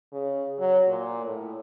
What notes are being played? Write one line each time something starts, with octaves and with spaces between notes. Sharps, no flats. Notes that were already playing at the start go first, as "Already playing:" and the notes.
C#3
F#3
A#2
A2